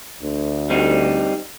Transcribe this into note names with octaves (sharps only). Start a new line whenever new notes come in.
D2
G3 C4 D#4